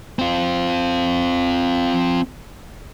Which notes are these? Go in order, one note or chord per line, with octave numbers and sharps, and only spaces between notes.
C4 F4